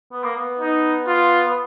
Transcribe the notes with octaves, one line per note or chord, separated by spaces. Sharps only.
B3
A#3
B3
D#4
F4
B3